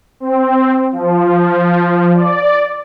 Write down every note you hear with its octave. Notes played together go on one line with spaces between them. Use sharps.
C4
F3
D5